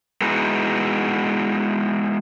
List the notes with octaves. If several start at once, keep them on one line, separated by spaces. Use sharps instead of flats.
G#3 B3 D#4 E4 F#4